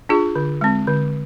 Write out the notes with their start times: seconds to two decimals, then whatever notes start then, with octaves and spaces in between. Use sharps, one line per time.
0.09 D4 F4 G#4
0.36 D3
0.61 G#3 C4
0.87 D3